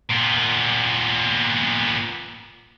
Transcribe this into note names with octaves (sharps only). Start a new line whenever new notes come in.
A#2 B3